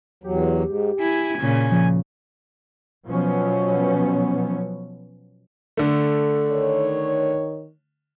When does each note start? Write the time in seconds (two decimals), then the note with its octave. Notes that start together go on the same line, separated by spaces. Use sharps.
0.24 E2 F#3 G4
0.65 G#2
1.00 E4 G#5
1.39 A#2 C#3
1.71 F3
3.06 B2 F3 F#3 B3 C#4
5.77 D3 A3
6.51 D#3 C#5